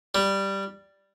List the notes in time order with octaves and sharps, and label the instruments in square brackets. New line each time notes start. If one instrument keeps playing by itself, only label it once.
[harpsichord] G3